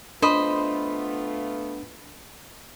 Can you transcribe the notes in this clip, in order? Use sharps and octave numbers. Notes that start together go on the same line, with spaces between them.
A3 B3 D4 F4 C5 D#5 B5